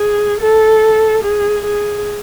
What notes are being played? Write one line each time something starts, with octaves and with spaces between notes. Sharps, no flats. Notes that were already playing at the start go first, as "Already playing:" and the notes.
Already playing: G#4
A4
G#4
G#4